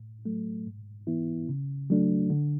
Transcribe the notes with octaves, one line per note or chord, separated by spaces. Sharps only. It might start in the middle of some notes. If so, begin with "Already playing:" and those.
Already playing: A2
F#3 A3
G#2
E3 B3 E4
C#3
F#3 A3 D4
D3